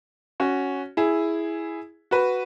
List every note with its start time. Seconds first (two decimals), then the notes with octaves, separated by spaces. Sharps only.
0.40 C#4 F#4
0.97 E4 G#4
2.11 F#4 B4